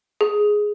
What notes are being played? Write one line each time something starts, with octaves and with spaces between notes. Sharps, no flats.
G#4